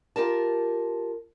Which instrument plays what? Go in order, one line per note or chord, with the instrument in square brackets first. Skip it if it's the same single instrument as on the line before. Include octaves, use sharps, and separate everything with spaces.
[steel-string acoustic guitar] F4 G4 A#4 A5